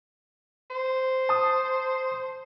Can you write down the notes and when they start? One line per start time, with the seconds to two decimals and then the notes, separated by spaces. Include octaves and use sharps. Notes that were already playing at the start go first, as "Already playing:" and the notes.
0.70 C5
1.29 A5 D#6